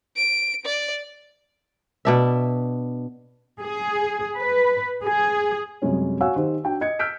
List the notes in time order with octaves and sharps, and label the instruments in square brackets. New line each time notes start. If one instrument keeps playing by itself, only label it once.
[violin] D7
D5
[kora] B2 D4 E5
[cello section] G#4
B4
G#4
[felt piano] F#2 C3 G3 G#3 C#4
F#4 C#5 F5 F#5 G#5 E6
D#3 G4 C5
D4 F#4 G5
D#5 G#6 C#7
E6 F6 G6 B6 D7